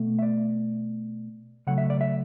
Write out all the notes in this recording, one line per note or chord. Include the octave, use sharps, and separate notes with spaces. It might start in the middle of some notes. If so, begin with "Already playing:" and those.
Already playing: B2 A3
E5
D5
C#3 F#3 A3 F#5
E5
D5
E5